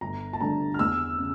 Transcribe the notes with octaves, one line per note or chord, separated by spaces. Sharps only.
G1 A#5
A5
G2 D3 A#5
F6
E2 E6
C#3